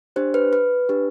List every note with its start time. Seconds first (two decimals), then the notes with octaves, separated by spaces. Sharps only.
0.16 D4 G4 C5
0.34 B4
0.53 B4
0.89 D4 G4